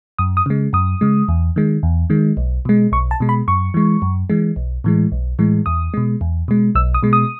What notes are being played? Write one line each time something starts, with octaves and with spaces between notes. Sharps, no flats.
F#2 D#6
D#6
C#3 G#3
F#2 D#6
C#3 G#3
E2
D#3 G#3
E2
D#3 G#3
B1
B2 G#3
B1 C#6
A5
B2 G#3
B5
F#2 C#6
E3 G#3
F#2
E3 G#3
B1
A2 E3 G#3
B1
A2 E3 G#3
E2 D#6
B2 G#3
E2
B2 G#3
B1 E6
D#6
B2 G#3
D#6